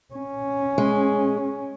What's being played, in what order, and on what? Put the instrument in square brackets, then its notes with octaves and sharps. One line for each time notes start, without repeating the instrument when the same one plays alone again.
[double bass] C#4
[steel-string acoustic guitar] G#3